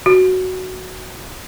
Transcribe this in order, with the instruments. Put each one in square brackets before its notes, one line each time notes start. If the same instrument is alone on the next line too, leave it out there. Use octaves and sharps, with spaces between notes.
[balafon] F#4